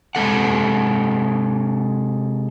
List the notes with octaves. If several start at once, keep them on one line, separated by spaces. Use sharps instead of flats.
C3 G#3 C4 A4 F#5